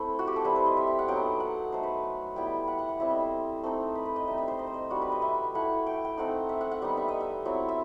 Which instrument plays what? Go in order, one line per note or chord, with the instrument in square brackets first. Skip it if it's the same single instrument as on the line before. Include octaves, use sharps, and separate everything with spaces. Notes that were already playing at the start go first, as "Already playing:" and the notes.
Already playing: [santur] A3 C4 E4 A4
F#4
G4
A4
G3 C4 E4 B4
C5
D#5
E5
E5
F#5
F#3 B3 D#4 G5
F#5
A3 D#4 C5
B4
G3 B3 E4 G5
F#5
F#5
F#5
G3 C4 E4 E5
D#5
C5
A3 C4 D#4
B4
B4
D#5
G3 C4 D#4 E5
D#5
C5
D#5
C5
D#5
G3 D#4 F#4
B4
D#5
E5
A3 E4 F#5
G5
G5
A3 C4 D#4 F#5
E5
F#5
F#5
G3 B3 D#4 F#5
E5
D#5
E5
F#3 C4 E4
E5